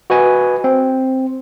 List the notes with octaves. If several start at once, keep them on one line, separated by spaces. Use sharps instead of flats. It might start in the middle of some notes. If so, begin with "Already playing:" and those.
F#4 B4 D#5 G#5
C4